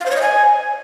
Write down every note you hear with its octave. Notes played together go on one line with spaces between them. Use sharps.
F5
C5
C#5
D#5
G#5